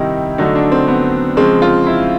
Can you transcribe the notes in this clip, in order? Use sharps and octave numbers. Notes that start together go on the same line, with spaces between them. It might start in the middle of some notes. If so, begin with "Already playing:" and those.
Already playing: C3 D#3 G3 D#4 E4
D3 F#3 A3 D#4
D4
C4
B3
C#3 F3 G#3 C4
F4
E4